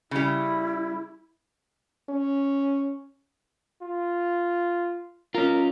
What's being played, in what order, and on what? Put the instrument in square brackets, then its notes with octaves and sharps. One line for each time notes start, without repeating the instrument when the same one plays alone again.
[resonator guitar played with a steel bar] C#3 G3 [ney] E4
[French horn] C#4
[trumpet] F4
[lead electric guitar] C#4 F4 [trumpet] A#4